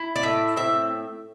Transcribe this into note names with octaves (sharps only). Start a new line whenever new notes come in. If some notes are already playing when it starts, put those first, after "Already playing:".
Already playing: E4
D5
A2 E5
C4 E5